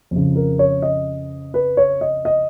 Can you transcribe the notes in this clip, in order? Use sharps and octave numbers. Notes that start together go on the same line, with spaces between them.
F2 C#3
A#4
C#5
D#5
B4
C#5
D#5
D#5